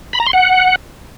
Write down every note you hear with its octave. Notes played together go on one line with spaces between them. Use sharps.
B5
A#5
C6
F#5